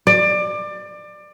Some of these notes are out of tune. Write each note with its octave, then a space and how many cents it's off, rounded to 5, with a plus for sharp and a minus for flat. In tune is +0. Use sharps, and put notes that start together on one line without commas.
D5 +25